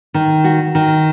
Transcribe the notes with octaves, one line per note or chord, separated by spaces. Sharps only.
D#3
F#4
D#3